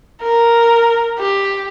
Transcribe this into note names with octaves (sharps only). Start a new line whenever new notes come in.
A#4
G4